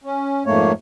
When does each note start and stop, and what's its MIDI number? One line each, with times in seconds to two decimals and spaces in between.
0.04 0.43 61
0.46 0.72 41
0.46 0.72 44
0.46 0.72 57
0.46 0.72 58
0.46 0.72 73